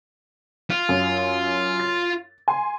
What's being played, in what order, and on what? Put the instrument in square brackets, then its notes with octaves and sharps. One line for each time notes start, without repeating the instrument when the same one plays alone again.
[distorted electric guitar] F4
[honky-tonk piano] F#2
A6
G#5 C6